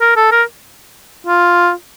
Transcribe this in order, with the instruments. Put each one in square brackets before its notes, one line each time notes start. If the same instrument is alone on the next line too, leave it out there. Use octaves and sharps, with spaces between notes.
[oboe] A#4
A4
A#4
F4